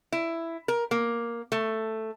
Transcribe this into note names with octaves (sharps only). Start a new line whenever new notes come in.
E4
A#4
A#3
A3